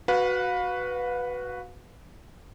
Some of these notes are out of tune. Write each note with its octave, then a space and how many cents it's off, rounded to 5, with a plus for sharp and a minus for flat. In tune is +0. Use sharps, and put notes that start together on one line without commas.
F#4 +0 B4 +0 F5 +40